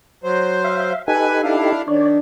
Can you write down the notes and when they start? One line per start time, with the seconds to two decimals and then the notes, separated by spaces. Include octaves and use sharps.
0.24 F#3 C5
0.64 E5 F5
1.08 D#4 G4 A4 B4 G#5
1.43 D4 E4 F5
1.88 D#3 D4 C#5 D5